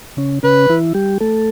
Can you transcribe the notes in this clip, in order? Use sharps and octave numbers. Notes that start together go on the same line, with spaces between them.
C#3 C#4
C#3 C#4 B4
E3 E4
G3 G4
A3 A4